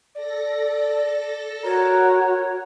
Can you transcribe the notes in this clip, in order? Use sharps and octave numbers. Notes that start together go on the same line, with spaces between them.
A4 D5 A#6
F#4 A#4 C#5